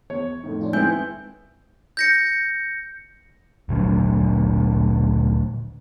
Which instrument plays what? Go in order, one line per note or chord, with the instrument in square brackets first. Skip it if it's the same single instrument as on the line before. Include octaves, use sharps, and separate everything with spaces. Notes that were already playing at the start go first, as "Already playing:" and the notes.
[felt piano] E2 [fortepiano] C#5
[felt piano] F2 A2 D#3
[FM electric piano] C#4 D4 F4
[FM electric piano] G#2 [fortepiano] B3 C4 E4 [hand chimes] G#5 G6
[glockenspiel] G6 A#6 C#7
[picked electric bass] D2 A#2 F#3 D4